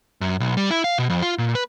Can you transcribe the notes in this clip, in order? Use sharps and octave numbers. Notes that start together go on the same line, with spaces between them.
F#2
B1
G3
E4
F5
B2
F2
F4
A#2
B4